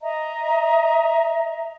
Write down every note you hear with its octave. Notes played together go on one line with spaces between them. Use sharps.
D#5 E5 A#5